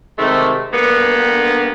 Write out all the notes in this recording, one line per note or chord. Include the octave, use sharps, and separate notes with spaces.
C3 D#3 G#3 A3
G2 D3 A#3 B3